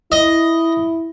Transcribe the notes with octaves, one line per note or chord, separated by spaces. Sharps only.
E4 D#5